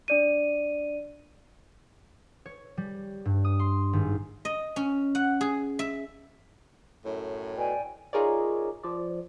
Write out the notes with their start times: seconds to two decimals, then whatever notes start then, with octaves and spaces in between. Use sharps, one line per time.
0.08 D4 D5 D#7
2.46 C#5
2.77 G3
3.25 G2
3.45 D#6
3.59 C6
3.93 G#1
4.45 D#5
4.76 C#4
5.15 F#5
5.41 G#4
5.79 E5
7.05 F#2 A2
7.57 B2 D5 G5 G#5
8.13 D#4 F4 G#4 A#4 C#5 D5
8.83 F3 D5